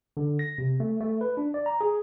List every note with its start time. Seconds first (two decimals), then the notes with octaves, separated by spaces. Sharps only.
0.17 D3
0.39 A#6
0.58 C3
0.80 A3
1.00 A3
1.21 B4
1.37 D4
1.54 D5
1.66 A#5
1.81 G#4